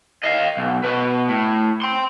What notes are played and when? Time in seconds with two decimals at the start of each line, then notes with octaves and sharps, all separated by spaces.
0.23 D#5 F5
0.57 B1
0.84 B2 B4
1.28 A2
1.82 G5 C6